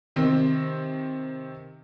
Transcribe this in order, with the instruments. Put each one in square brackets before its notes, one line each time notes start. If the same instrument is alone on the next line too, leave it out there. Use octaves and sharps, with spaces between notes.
[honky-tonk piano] C3 D#3 C4